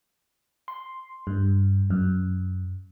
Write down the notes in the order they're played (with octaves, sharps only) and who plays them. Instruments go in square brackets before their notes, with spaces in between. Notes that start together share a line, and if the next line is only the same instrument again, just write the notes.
[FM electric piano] C6
G2
F#2